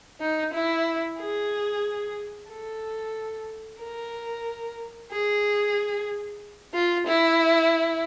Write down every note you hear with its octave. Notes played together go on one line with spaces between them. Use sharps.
D#4
E4
G#4
A4
A#4
G#4
F4
E4